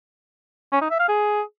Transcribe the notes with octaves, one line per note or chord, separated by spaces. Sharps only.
C#4
D#4
E5
F5
G#4